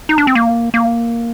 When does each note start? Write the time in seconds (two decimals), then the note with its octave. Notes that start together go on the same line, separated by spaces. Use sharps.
0.09 D#4
0.18 D4
0.27 C4
0.35 A#3
0.74 A#3